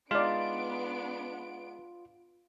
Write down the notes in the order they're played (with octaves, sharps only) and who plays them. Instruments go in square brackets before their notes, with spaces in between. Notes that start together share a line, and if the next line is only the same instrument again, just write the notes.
[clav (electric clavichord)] G#3 D#4 [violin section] B3 D4 D7 [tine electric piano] F4 [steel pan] D5 F5